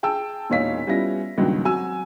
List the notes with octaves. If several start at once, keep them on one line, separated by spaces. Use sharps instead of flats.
G#4 G5 A5 E6
E1 A#2 D#4 C#5 F5 B6
G3 B3 C#4 E4 F4 A#6
C#2 G2 A#2 D#3 F#3
F#3 C4 F#4 G#5 E6